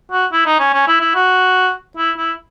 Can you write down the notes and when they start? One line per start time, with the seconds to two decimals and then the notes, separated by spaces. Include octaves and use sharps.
0.12 F#4
0.33 E4
0.46 D#4
0.59 C#4
0.74 C#4
0.88 E4
1.01 E4
1.15 F#4
1.97 E4
2.17 E4